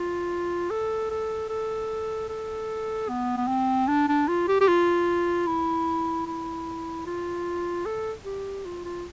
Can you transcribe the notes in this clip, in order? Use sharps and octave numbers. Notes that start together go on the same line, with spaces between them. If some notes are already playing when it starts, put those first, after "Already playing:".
Already playing: F4
A4
A4
A4
A4
B3
B3
C4
D4
D4
F4
G4
G4
F4
E4
E4
F4
A4
G4
F4
F4